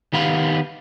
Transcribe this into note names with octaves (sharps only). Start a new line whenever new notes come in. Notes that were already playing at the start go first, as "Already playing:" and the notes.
D#3 B3 G4 F5 B5